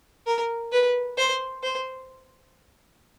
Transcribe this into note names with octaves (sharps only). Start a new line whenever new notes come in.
A#4
B4
C5
C5